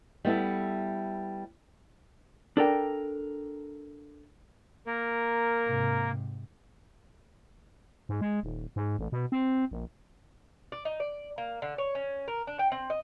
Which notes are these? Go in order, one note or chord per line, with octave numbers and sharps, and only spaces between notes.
G3 B3 E4 A4
D4 A4 A#4 G5
A#3 A#4
G#2 C3
G#2
G#3
D#1
G#2
A1
B2
C4
A#1
D5
D#4
D5
A#3
D3
C#5
C#4
A#4
D4
G5
C4
D#5